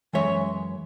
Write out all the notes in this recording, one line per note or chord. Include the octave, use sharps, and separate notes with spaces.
F#2 E3 G#3 C#5 E5